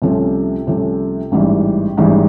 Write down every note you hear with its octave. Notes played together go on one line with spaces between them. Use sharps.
C2 C3 F3 A3 C#4
C2 C3 F3 A3 C#4
A1 G#2 E3 G3
A1 G#2 E3 G3